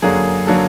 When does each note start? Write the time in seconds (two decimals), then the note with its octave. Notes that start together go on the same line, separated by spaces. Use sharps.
0.02 F#2 D3 F#3 A#3 G#4
0.47 D3 F#3 A#3 A4